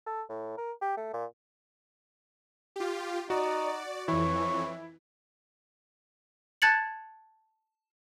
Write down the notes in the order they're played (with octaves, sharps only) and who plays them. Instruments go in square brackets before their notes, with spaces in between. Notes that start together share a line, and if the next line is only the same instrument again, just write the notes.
[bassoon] A4
A2
A#4
G4
A3
A#2
[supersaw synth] F4 G4
[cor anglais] D#4 [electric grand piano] F#4 [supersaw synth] D5
[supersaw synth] F2 E3 [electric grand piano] E4 [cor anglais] C#5
[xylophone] A5 F#6 G#6 A6 C#7 F#7